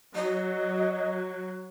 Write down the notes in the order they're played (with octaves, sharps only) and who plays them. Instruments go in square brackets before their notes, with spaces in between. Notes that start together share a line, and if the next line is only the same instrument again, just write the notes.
[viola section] F#3 [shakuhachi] D#5